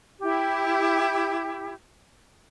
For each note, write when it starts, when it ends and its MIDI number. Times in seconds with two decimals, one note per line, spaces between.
0.22 1.74 64
0.22 1.74 67